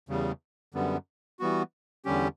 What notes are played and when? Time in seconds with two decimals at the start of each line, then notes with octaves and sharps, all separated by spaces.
0.09 E2 C#3 G3
0.74 F#2 D3 G3 B3
1.39 E3 G3 B3 F#4
2.05 E2 D3 G3 C#4 G4